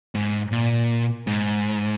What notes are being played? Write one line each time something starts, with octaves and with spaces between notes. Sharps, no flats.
G#2
A#2
G#2